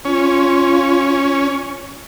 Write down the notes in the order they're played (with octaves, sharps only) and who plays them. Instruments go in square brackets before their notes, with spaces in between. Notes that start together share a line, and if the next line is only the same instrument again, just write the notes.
[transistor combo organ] C#4 [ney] F4